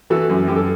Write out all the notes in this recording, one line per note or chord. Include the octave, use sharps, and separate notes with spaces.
E3 F#4 A4
F#2
F#2 G4
A4